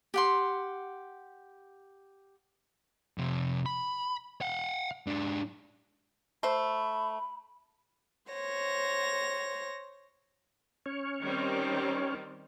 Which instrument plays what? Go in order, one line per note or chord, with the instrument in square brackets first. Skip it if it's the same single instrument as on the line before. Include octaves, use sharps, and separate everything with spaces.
[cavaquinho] G4 F#5 C6
[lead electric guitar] F2 C3
B5
F5 F#5
G#2 D4
[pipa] A3 C5 [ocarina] B5
[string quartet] C5 C#5 A#6
[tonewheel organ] C#4 C#5
[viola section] D#3 G3 C4